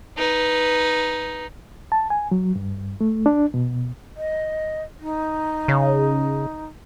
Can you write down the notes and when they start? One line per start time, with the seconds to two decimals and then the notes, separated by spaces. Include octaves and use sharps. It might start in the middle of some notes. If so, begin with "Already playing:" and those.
0.17 D#4 B4
1.92 A5
2.10 G#5
2.31 F#3
2.56 G2
3.01 A3
3.26 D4
3.54 B2
4.16 D#5
5.00 D#4
5.68 C#3